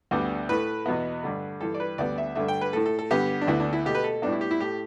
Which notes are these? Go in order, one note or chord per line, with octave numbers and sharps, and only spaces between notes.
D2 D3 G3 B3
A2 A3 B4
E2 B2 B3
G2 D3 A3
G2 E3 G3 A4
D5
B4
D2 D3 G3 B3 D5
E5
G2 D3 A3 E5
G5
B4
A2 A3 A4
A4
A4
G2 D3 B3 G4
D4
D2 D3 B3 E4
D4
E4
B2 A3 G4
B4
A4
A2 G3 B3 D4
E4
G4
E4
A2 A3 G4